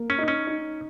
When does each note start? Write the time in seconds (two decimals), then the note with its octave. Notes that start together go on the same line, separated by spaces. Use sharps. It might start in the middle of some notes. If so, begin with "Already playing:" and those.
Already playing: A#3
0.10 C#4
0.18 D#4
0.28 C#4
0.47 D#4